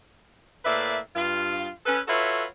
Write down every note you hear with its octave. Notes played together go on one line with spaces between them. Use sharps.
A2 A#3 B4 D5 E5
G2 F4
C#4 A4 B4
F4 F#4 A4 B4 C#5 E5